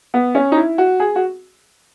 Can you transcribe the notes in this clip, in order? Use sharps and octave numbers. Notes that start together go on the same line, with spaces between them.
B3
C#4
D#4
E4
F#4
G#4
F#4